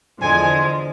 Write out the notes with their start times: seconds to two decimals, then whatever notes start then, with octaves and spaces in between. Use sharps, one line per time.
0.20 E2 D3 F3 G#3 G#5